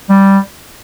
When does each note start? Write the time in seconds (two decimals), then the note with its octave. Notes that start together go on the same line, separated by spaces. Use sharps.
0.09 G3